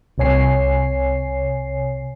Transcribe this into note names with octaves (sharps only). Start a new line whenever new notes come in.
C2 C3 C#5 G#5 C7